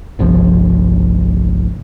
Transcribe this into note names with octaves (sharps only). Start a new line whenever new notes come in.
G1 C2 F3